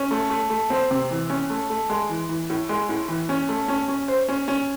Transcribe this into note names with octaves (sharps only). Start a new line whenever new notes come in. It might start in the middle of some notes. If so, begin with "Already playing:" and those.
Already playing: C#4
A3
A3
A3
C4
C3
E3
C#4
A3
A3
G#3
E3
E3
A2
G#3
A2
E3
C#4
A3
C#4
C#4
C5
C#4
C#4